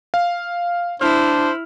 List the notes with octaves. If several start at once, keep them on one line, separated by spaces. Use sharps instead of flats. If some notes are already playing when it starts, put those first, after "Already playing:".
F5
D4 E4 C5 F6